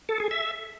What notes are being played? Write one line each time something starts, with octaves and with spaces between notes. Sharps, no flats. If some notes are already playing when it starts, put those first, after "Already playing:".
A4
G#4
E5